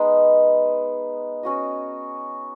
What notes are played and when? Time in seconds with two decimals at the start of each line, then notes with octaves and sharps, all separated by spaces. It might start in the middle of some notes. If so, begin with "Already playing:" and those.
Already playing: G#3 B3 D#4
1.43 C#4 F#4 D#5